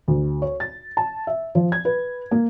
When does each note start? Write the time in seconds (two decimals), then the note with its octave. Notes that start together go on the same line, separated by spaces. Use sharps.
0.08 D2
0.42 C#5
0.60 A6
0.97 A5
1.27 E5
1.55 F3
1.72 G#6
1.85 B4
2.31 A#3